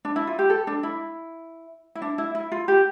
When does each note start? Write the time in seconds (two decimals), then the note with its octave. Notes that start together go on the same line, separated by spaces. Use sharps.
0.05 D4
0.16 E4
0.27 F4
0.39 G4
0.50 A4
0.67 D4
0.83 E4
1.95 E4
2.02 D4
2.18 E4
2.35 E4
2.52 F4
2.68 G4